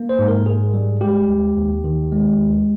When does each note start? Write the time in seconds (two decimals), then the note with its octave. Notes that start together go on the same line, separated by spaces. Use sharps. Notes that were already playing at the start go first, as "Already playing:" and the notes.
Already playing: A#3
0.09 C5
0.19 G#2
0.28 A#4
0.46 G#2 G#4
0.74 G3
1.01 G#3 G4
1.29 D#2
1.57 D#2
1.84 D#3
2.12 G#3
2.39 D#2